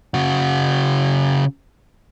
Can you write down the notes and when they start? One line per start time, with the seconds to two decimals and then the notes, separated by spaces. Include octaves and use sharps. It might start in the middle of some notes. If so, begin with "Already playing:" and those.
0.14 C#3 F#4